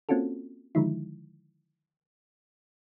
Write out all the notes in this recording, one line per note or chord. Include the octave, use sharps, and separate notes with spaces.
A#3 C4 C#4 F4 F#4 A4
D3 D#3 F3 G#3 D#4 E4